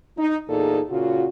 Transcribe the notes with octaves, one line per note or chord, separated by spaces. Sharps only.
D#4
E2 A#2 D#4 G#4 A4
A#2 C#3 F4 F#4